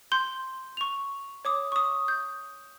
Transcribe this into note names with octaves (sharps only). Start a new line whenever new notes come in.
C6 G6
C#6 F7
C#5 D6 D#6
C#6 D#6
G6